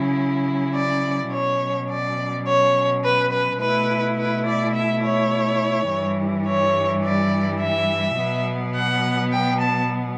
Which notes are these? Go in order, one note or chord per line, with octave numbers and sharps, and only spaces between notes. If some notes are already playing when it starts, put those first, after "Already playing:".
Already playing: C#3 F#3 C#4 E4
D5
B2 F#3 C#4 C#5
D5
C#5
B4
B4
B2 A3 E4 B4
B4
D5
E5
C#5
G2 E3 G3
C#5
D5
E5
B2 F#3 B3
F#5
G5
A5